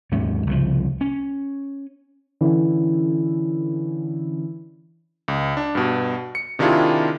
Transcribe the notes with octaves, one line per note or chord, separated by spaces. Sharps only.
D#2 G#2 C3 C#4
C2 C#3 E3 F3
C#4
D3 E3 C#4 E4
C#2
D4
G2 B2
C#7
C3 D#3 D4 E4 F4 G#4